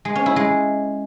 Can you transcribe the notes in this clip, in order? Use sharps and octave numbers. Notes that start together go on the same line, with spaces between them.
G#3
C#4
E4
G#3